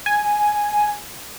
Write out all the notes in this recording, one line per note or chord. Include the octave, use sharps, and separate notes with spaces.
G#5